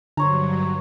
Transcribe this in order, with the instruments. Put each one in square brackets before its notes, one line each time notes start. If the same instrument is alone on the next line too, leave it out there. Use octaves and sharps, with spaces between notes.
[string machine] G2 F#3 [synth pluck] D3 [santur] C5 C#5 A#5